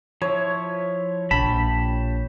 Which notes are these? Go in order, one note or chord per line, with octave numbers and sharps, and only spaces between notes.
F3 E4 C#5
A#1 G4 A5 B5